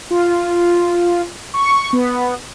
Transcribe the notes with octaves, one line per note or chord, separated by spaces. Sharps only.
F4
C#6
B3